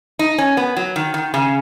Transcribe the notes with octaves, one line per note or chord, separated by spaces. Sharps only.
D#4
C#4
B3
F#3
D#3
D#3
C#3